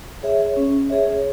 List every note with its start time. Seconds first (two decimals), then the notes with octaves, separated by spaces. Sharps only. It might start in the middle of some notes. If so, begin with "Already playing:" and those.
0.23 G#4 C#5 E5
0.56 C#4
0.90 G#4 C#5 E5